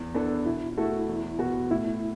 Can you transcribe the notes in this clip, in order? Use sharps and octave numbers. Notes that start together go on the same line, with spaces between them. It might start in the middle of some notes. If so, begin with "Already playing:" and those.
Already playing: E2
E3 B3 D4 A4
B2 E4
A3 E4 F#4 A4
E2
B2 B3 F#4
A2 E4